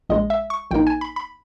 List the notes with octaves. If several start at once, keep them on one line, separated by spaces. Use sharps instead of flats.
A#1 A#2 G#3 D#5
E5
C#6
A#1 A#2 A#3 D#4 G5
G#5
B5
B5